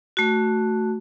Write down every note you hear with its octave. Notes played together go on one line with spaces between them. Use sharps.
A3 F#4